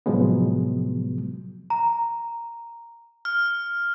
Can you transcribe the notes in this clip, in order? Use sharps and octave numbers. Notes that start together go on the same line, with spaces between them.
A2 C3 F3 F#3 G#3 B3
A#5
F6